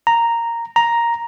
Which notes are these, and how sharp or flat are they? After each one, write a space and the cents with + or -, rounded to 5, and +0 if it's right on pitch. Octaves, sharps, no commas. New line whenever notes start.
A#5 -5
A#5 +5